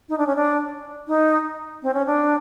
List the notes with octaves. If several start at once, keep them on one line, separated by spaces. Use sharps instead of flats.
D#4
D4
C#4
D4
D#4
C4
C#4
D4